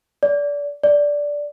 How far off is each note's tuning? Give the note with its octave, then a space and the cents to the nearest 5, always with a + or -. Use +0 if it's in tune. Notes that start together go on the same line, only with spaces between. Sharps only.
D5 -25
D5 -10